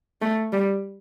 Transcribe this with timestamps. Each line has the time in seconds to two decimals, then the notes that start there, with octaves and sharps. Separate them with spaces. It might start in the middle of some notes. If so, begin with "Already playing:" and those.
0.21 A3
0.53 G3